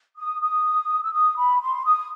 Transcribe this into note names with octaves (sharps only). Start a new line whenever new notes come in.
D#6
D#6
E6
D#6
B5
C6
D#6